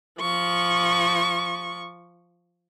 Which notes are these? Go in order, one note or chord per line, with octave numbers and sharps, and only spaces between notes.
F3 C#6